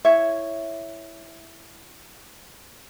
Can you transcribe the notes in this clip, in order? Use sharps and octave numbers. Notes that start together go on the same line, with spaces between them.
E4 C#5 E5